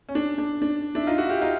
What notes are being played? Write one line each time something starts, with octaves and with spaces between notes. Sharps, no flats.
C#4
D4
D4
D4
D4 E4
D#4 F4
E4 F#4
F4 G4
D#4 F4